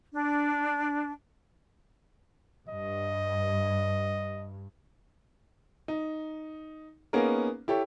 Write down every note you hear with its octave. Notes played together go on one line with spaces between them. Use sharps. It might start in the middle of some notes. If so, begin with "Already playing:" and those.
D4
G2 D#5
D#4
A#3 B3 C#4 D#4 G#4 A#4
E4 G4 A4 C#5